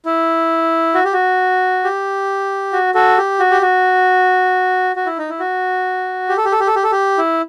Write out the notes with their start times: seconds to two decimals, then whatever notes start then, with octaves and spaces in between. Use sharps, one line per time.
0.06 E4
0.94 F#4
1.04 G4
1.13 F#4
1.84 G4
2.73 F#4
2.94 F#4 A4
3.18 G4
3.39 F#4
3.51 G4
3.62 F#4
4.96 F#4
5.06 E4
5.18 D#4
5.29 E4
5.40 F#4
6.29 G4
6.37 A4
6.45 G4
6.52 A4
6.60 G4
6.67 A4
6.76 G4
6.84 A4
6.92 G4
7.18 E4